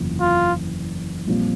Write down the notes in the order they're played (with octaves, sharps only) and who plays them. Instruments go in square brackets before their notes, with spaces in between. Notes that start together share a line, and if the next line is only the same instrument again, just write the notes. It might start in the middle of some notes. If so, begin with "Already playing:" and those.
Already playing: [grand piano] F#1 E2 C3 F3
[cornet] F4
[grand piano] A#1 A#2 G3 C4 F4